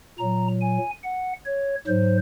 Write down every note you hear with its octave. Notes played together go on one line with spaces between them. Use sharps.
A#2 F#3 A#5
G#5
F#5
C#5
G#2 F#3 C5